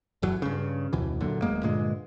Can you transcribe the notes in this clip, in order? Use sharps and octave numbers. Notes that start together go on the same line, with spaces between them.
G1 E2 F#3
G2 C#3
F1 D2 B2 E3
F#2 A#2 D3
D1 F#2 G#3 A#3
G2 A#2 D3 G#3